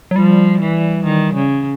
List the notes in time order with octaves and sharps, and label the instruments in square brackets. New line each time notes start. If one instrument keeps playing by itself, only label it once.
[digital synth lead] F#3
[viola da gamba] F3 [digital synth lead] G3
[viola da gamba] E3
D#3
C#3